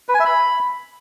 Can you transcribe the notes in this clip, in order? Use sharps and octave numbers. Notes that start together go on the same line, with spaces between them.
B4
G#5
E5
B5